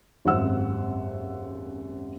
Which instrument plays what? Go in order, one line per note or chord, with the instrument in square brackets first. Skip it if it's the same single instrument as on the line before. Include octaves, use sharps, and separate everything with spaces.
[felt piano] D#1 G#1 F#2 C4 F#5 E6